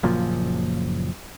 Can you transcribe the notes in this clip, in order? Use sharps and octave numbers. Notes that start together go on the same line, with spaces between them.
F#1 F#2 A#2 F3